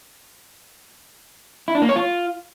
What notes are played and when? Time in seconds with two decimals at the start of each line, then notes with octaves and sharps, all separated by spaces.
1.68 E4
1.75 D4
1.82 A#3
1.89 C#5
1.96 F4